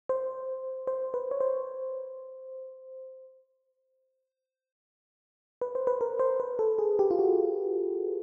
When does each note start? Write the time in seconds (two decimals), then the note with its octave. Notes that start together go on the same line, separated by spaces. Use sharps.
0.09 C5
0.87 C5
1.14 B4
1.31 C#5
1.41 C5
5.61 B4
5.75 C5
5.87 B4
6.01 A#4
6.19 C5
6.40 B4
6.59 A4
6.79 G#4
6.99 G4
7.11 F4
7.19 F#4